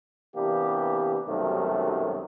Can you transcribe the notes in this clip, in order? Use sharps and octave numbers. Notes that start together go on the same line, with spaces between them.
C3 E3 A#3 B3 D4 G4
B1 F#2 C3 D#3 G3 A3